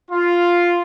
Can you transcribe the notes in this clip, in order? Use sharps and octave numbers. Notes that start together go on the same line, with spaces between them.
F4